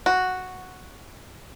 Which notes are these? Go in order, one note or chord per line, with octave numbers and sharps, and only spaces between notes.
F#4